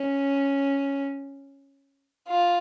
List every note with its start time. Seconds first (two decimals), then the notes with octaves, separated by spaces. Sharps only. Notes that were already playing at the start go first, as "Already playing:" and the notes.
Already playing: C#4
2.28 F4